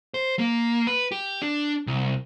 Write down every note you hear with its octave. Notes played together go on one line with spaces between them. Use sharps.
C5
A#3
B4
G4
D4
C2